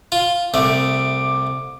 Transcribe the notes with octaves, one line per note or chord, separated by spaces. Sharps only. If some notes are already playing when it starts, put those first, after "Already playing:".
F4
C2 A3 D6